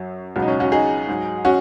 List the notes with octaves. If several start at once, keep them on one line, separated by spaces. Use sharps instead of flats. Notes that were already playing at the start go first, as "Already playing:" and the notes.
Already playing: F#2 F#3
C#2 B2 F#3
D#4
C#4
C#4 F#4
D#4 G#4
G#2 F#3
C#4 F#4